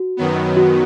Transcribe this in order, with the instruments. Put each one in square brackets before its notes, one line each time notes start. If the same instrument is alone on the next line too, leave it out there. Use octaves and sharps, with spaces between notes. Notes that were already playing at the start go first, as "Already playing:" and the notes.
Already playing: [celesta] F#4
[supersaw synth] F#2 D#3 F#3 B3
[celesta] F#4